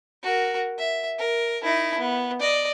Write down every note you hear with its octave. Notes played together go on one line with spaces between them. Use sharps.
F#4 A#4
E5
A#4
D#4 E4
B3
D5 D#5